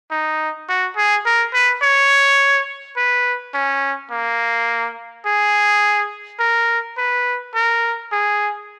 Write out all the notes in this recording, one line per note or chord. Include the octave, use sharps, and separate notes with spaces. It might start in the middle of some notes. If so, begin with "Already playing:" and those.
D#4
F#4
G#4
A#4
B4
C#5
B4
C#4
A#3
G#4
A#4
B4
A#4
G#4